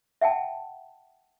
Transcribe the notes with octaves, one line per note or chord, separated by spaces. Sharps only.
E5 F#5 G5 A5